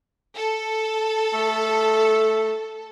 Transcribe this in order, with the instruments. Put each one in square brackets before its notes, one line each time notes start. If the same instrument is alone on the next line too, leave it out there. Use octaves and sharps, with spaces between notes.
[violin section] A4
[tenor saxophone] A3